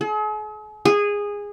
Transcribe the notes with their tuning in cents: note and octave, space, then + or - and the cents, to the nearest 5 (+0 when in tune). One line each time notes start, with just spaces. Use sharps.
G#4 +45
G#4 -15